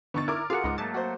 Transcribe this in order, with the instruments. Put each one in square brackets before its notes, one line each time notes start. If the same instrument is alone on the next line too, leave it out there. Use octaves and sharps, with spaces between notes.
[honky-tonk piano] D3 C#6 A6 [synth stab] B3 D#4
[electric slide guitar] E4 [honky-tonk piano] A#4 D6
[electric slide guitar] F4 F#5 [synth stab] F#4 F5 [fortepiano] G#4
[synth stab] C#2 D#4 [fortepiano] G#2
[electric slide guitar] F#3 A3 A#3 [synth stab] A5
[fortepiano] F#4 C5